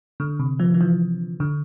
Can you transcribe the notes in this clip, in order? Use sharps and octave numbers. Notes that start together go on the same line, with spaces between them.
D3
C3
F3
F3
E3
D3